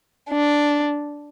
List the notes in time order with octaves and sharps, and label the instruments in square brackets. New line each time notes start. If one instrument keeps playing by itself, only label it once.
[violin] D4